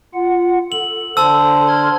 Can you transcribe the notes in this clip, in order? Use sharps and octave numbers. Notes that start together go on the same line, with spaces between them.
F4 F#5
A4 F#7
D3 C5 A5 E6
C6 F6 G#6